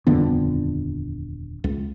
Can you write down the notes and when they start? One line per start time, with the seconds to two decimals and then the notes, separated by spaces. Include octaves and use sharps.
0.07 D#1 F2 D3 B3
1.64 C#2